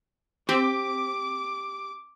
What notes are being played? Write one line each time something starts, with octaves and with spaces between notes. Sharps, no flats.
C4 G4 D6